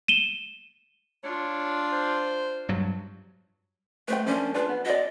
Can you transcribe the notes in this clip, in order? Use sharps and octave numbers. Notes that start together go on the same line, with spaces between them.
D#7 E7 G7
D4 F4 C#5
C5
G2 F#3
A3 B4 C5 G5
F3 A#3 C#4 D4
D4 F4 G#4 B4
B3
F#4 D5 D#5